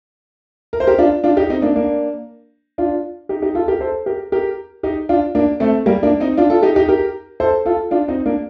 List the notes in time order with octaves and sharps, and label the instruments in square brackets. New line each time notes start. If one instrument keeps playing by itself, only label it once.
[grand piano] A#4
C5
G4 A#4
D4 F4
D4 F4
D#4 G4
C4 D#4
A#3 D4
A#3 D4
D4 F4
D#4 G4
D#4 G4
F4 A4
G4 A#4
A4 C5
G4 A#4
G4 A#4
D#4 G4
D4 F4
A#3 D4
A3 C4
G3 A#3
A#3 D4
C4 D#4
D4 F4
F4 A4
D#4 G4
D#4 G4
G4 A#4
A4 C5
F4 A4
D4 F4
C4 D#4
A#3 D4